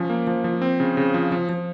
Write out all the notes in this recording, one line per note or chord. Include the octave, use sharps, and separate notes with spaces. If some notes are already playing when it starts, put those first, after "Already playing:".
Already playing: F3 C#4
A#3
F3
F3
C4
C#3
C#3
F3
F3
F3